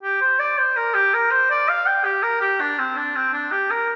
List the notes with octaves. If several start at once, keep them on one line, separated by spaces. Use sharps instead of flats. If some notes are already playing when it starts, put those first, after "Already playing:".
G4
C5
D5
C5
A#4
G4
A#4
C5
D5
F5
G5
G4
A#4
G4
D4
C4
D4
C4
D4
G4
A#4